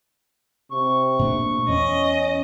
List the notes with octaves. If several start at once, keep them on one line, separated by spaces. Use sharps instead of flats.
C3 C#6
A#2 A3 D4
E2 C#4 D#5